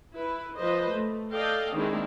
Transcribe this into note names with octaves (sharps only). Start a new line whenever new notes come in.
E4 B4
F3 B4 C5 D#5
A3
A4 D5 D#5 F5 G5
D#3 G#3 A#3 C4 D4 E4